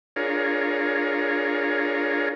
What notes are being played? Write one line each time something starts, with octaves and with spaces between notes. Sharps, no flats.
D4 F4 G#4 A#4 C#5